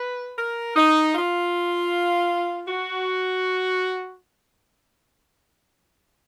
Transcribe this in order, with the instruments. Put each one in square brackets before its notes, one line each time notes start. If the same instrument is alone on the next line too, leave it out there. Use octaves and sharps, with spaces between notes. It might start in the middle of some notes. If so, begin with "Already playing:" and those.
Already playing: [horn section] B4
A#4
D#4
F4
F#4